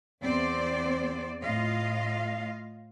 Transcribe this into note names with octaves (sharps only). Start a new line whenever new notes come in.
E2 C4 C5 D5
A2 F4 D#5 F5